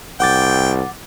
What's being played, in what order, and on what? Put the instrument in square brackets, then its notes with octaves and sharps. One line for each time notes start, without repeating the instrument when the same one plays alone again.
[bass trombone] C2 [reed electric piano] F#5 D6 A6 [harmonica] G5